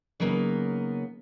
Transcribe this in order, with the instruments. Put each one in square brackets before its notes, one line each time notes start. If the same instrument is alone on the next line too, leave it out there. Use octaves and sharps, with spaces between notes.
[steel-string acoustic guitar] C#3 F#3 G3 A#3 B3 D#4